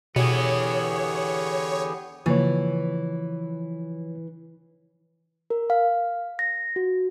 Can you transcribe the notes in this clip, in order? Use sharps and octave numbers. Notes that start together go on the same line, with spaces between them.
B2 D3 E3 B3 G4 G#4 C#5
C#3 E3 F3 A#3 C#5
A#4
F5
A#6
F#4